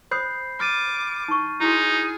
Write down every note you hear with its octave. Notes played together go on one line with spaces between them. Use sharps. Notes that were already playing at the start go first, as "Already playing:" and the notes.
C5 B5 D#6 G6 C7
D6 F6 A6 D#7
D#4 C#6
D#4 E4 F#4 G#4